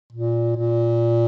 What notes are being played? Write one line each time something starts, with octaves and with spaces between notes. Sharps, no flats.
A#2
A#2